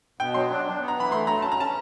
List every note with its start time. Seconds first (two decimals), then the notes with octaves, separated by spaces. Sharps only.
0.19 B2 G5
0.34 F#3 C6
0.50 D4
0.65 D4
0.81 B3
0.88 A#5
0.97 E3 B5
1.11 A3 C6
1.27 F#3 A#5
1.42 C#4 A5
1.52 A#5
1.58 C#4 A5